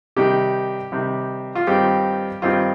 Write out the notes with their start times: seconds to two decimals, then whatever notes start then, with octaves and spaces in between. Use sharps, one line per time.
0.16 C3 D#3 G3 G4
0.92 C3 D#3 G3
1.55 F4
1.67 G2 D#3 G3 C4 F4 G4
2.42 G2 D#3 G3 C4 F4